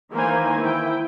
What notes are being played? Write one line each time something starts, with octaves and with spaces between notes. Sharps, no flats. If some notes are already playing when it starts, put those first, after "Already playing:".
D#3 E3 A#3 A#4 C5 G#5
E4 G5